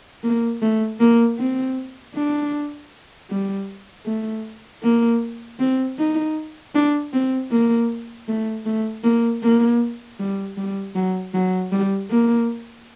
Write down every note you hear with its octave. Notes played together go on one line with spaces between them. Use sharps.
A#3
A3
A#3
C4
D4
G3
A3
A#3
C4
D#4
D4
C4
A#3
A3
A3
A#3
A#3
G3
G3
F#3
F#3
G3
A#3